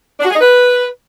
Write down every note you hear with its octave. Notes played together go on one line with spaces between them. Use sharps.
D4
F#4
G#4
D#4
B4